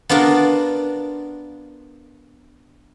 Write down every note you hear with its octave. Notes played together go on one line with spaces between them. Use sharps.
B3 D4 F4 A#4